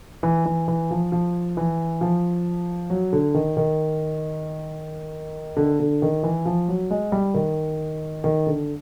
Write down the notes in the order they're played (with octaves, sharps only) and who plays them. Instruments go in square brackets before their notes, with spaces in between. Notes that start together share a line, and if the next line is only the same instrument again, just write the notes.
[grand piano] E3
E3
E3
F3
F3
E3
F3
F#3
D3
D#3
D#3
D3
D3
D#3
E3
F3
F#3
G#3
G3
D#3
D#3
D3